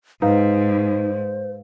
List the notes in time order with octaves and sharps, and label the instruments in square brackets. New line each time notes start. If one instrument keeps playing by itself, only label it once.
[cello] G#2 [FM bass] D#4 [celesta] B4 F5 [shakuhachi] C5